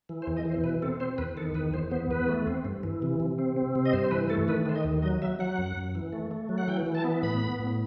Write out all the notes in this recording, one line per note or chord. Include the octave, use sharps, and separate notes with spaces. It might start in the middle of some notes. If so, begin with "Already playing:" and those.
E3
C5
E2
D#5
E3 C5
B2 B4
C4 A4
C4 C5
E2 B4
D#3 A4
E2 B4
E2 C5
B3 C5
E2 B4
A3
C4
G2
E3
C3
C3
C4
C4
C3
D#5
G2 C5
C5
E3 B4
A3 A4
D#3 B4
D#3 C5
D#5
D#2
F#3 D#5
F#3 E5
F#3 F#5
F#2
F#2
E3
A3
A3
F#3
F#5
E3 G5
E3
A5
B3
A2 B5
B3
A2